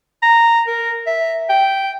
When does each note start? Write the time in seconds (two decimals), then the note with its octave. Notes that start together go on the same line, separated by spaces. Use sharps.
0.22 A#5
0.67 A#4
1.07 E5
1.50 G5